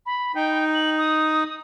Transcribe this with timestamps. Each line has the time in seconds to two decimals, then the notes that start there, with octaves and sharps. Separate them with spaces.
0.06 B5
0.35 D#4 G5
0.74 F#7
0.98 D#6